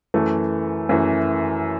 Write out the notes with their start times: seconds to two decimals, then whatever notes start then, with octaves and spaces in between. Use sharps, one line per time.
0.14 F#2 E3 A3
0.89 F#2 E3 A3